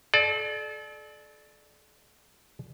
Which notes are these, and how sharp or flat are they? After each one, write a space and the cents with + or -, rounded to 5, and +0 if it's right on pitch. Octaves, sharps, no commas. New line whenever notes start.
A4 -35 D5 +20